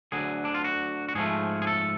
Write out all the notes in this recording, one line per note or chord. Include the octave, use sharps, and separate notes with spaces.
D2 D3 F#3 G#4
D4
F4
F#4
F#4
G#2 F3 A3 G#4
G#4
A4